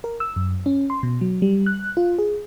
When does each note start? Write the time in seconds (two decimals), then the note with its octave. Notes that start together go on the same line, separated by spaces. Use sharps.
0.04 A#4
0.20 E6
0.36 F#2
0.66 C#4
0.90 C6
1.03 B2
1.21 F#3
1.42 G3
1.66 F#6
1.97 F4
2.18 G#4